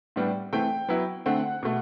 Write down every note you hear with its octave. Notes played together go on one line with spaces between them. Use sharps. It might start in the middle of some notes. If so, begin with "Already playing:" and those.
A2 G3 B3 D4
E3 A3 C4 G5
F#3 B3 E4
D3 A3 C4 F#5
B2 A3